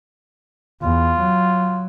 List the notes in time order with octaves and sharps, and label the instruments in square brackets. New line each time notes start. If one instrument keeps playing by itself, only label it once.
[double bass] E2 [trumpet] F4
[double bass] F#3